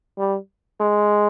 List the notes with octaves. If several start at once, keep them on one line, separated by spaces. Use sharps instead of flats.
G3
G#3